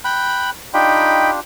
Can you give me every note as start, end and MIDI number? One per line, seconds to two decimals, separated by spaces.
0.05 0.50 79
0.05 0.50 83
0.05 0.50 90
0.74 1.40 62
0.74 1.30 63
0.74 1.40 65
0.74 1.40 67
0.74 1.30 79
0.74 1.30 83